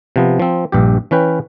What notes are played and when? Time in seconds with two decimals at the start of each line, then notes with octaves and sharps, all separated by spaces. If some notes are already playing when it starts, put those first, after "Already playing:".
0.16 C3 F3 B3
0.39 F3 C4
0.72 A#1 G2 G4
1.11 E3 C#4 B4 G5